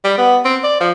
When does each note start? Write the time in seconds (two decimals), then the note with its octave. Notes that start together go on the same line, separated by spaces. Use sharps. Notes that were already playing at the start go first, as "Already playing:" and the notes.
0.04 G3
0.18 B3
0.45 C4
0.64 D5
0.80 F3